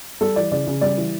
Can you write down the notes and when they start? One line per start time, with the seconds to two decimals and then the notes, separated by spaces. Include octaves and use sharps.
0.21 G3 A4
0.36 E3 D5
0.52 C#3 D5
0.67 C#3
0.81 G3 D5
0.98 E3